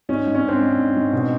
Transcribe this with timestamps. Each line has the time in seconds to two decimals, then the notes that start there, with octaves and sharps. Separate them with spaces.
0.09 G#2 C#4 D#4
0.26 G#2
0.35 C#4
0.43 G#2 C4 D4
0.61 G#2
0.79 G#2
0.96 G#2
1.13 B2